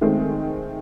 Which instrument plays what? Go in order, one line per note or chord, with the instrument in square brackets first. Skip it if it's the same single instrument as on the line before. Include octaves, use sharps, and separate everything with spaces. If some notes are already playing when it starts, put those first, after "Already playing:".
[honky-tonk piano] D#3 G#3 A3 C4